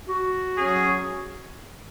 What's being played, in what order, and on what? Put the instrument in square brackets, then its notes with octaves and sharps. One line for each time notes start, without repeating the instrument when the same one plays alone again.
[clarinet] F#4
[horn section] F#3 C#4 G#4